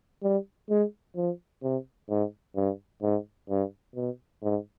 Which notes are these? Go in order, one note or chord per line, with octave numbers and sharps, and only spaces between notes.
G3
G#3
F3
C3
G#2
G2
G#2
G2
B2
G#2